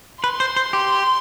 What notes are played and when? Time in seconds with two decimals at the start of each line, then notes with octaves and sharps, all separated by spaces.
0.24 B4 C6
0.40 C5
0.56 C5
0.73 G4